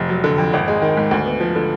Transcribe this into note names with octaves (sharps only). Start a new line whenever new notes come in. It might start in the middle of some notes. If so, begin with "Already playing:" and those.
Already playing: F1
F#3
D3
F2
G#1
G#3
D#3
G#2
D2
B3
F3
D3